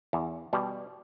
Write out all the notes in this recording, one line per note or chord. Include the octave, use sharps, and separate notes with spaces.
E2
B2 G3